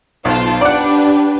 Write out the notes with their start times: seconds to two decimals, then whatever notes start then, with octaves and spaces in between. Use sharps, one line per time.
0.25 B1 F4 C5 A5
0.61 D4 G4 B4 D5 F#5